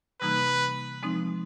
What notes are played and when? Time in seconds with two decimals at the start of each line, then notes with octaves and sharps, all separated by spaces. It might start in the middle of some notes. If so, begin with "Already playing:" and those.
0.21 C3 E3 G3 A#3 D#4 B4
1.03 F3 G#3 C4 D#4